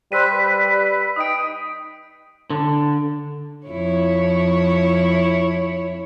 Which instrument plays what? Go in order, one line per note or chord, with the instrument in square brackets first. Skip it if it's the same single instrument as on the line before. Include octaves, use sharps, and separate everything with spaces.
[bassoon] G3 [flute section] C5 B5 F#6 [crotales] E6 B6 D#7
[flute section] B4
[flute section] D#4 G5 [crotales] D#6 D7
[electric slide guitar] D3
[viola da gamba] F2 E4 C#5